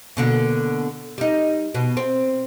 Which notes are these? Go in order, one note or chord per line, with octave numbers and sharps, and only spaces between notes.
B2 D3 A#3
G3 D#4
B2
C4